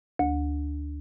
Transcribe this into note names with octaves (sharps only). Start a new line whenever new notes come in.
D2